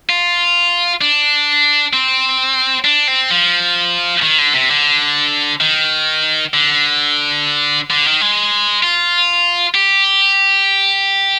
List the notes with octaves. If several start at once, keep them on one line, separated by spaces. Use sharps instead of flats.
F4
D4
C4
D4
C4
F3
D#3
D3
C3
D3
D#3
D3
D3
D#3
G#3
F4
G4